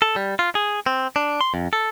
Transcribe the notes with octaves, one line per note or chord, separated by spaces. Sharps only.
A4
G3
F4
G#4
C4
D4
C6
F2
A4